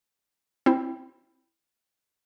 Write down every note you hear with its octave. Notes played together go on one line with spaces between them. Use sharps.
C4 E4